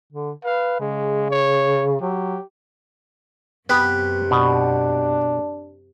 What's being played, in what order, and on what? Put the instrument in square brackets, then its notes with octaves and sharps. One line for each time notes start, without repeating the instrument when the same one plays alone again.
[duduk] D3
[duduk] B4 [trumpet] F5
[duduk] C#3 [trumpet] G#3
[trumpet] C#5
[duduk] F#3 [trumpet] G4
[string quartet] F#2 C3 [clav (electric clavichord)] B3 [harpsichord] G4 B4
[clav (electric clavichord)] B2 [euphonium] D4